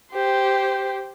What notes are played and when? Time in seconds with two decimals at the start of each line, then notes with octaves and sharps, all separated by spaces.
0.12 G4 C5